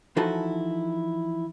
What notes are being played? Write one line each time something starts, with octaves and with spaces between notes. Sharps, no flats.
E3 F3 D#4 E4 F#4 A4